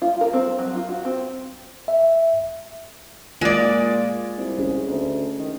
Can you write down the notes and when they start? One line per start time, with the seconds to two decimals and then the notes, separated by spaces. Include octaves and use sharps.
0.02 F4
0.21 A#4
0.33 C4
0.59 F#3
0.75 F4
0.89 F#4
1.05 C4
1.88 E5
3.41 A#2 G#3 F4 D5
4.38 C2
4.59 C#4 G#4
4.87 D2
5.39 D#3